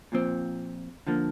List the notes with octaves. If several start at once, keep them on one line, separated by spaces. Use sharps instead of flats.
A#2 F3 C4
D3 F3 A#3